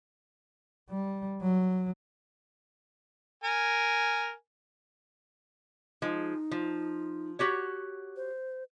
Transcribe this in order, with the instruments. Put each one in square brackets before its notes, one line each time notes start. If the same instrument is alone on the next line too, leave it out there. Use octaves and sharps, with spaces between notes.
[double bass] G3
F#3
[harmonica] A#4 G#5
[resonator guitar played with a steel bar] F3 G#3 [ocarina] D#4
[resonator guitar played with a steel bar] F3
F#4 G4 C#5
[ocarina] C5